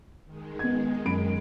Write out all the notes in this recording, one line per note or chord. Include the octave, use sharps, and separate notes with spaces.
D#3 G#3
B3 G#6
F#2 B5 D7